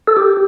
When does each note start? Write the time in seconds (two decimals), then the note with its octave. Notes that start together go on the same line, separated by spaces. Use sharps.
0.07 A4
0.17 G4